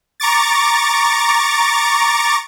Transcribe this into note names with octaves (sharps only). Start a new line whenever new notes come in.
A#5 C#6 D6 A6